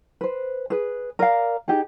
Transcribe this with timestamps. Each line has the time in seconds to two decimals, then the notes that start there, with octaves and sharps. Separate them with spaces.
0.21 B4 C5
0.70 G#4 B4
1.19 A#4 D5 F5
1.68 D#4 G4 G#4